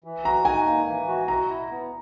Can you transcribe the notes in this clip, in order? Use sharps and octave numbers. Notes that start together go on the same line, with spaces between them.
E3
F#4 A#5
D#4 G#5
A#3
E3
F#4
B2 A#5
E4
B3